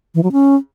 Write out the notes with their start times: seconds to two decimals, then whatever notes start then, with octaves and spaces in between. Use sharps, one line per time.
0.15 E3
0.23 F#3
0.32 C#4